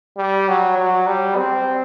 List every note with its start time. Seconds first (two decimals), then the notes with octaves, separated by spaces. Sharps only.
0.17 G3
0.48 F#3
0.78 F#3
1.07 G3
1.37 C4